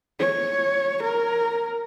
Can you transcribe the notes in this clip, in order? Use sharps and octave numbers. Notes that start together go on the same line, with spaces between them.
C#5
A#4